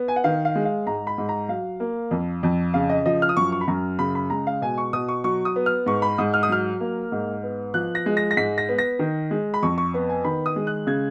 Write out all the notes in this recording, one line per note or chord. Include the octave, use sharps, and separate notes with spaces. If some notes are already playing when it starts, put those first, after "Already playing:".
Already playing: B3
G#5
F#5
D#3 F5
F5
G#3
F5
G#2 A#5
B5
G#2
A#5
F#3 F5
A#3
F2
F2
C#3 F5
D#5
F3 D#5
F6
D#6
F#2 C#6
C#6
B5
F#2 A#5
C#3 B5
B5
G#3 A#5
F5
B2 G#5
C#6
B2 D#6
C#6
F#3 C#6
D#6
B3
F6
G#2 C#6
B5
G#2 D#6
F6
D#6
F#3 F6
A#3
G#2
B3
F3 F#6
A#6
G#3
A#6
A#6
G#2 B6
A#6
B3
A#6
D#3
G#3
B5
F2 C#6
C#6
B3
G#5
D#3 B5
D#6
G#3
F#6
C#3 G#6